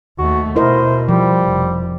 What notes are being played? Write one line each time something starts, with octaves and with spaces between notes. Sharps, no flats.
D#2 A3 F#4
B2 E4 A#4 C5 D#5
F3 G3
F1